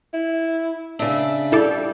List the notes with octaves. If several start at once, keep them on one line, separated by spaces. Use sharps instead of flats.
E4
C#3 D4 E5
G3 E4 A4 D5